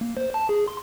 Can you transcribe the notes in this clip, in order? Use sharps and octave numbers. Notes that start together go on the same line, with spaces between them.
A#3
C5
A5
G#4
C6